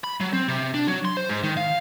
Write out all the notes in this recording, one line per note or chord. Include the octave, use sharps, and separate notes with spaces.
B5
F#3
C4
C3
D4
F#3
C6
C5
G#2
D#3
F5